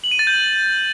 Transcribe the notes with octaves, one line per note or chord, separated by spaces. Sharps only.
F#7
D#7
A6
G6